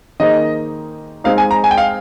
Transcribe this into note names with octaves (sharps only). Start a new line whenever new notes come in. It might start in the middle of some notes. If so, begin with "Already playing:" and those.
D#3 A#3 D#4 G#4 C5 D#5
G#3 C4 D#4 F5
G#5
A#5
G#5
G5
F5